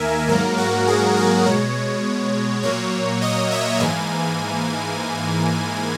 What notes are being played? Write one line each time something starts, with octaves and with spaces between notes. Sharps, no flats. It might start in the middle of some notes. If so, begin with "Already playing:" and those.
Already playing: D#2 D#3 A#3 A#4 E5 G#5
G#2 F#3 A#3 A#4
F#4
G#4
A#4
B2 G#3 C#5
A#2 F#3 A#3 C#5
D#5
E5
G#2 E3 A#3 G#5